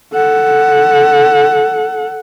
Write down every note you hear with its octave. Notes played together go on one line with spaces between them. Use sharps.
A4 F#5